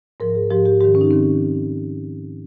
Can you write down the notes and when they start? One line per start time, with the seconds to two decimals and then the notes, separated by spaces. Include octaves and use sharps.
0.20 G#2 F3 A#4
0.35 G#4
0.50 G#2 F3 G4
0.66 G4
0.81 G#2 D#3 G4
0.95 C#4
1.01 D#4
1.11 D#3 C4